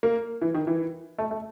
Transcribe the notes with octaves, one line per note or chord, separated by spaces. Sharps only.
A#3
E3
D#3
E3
A3
A3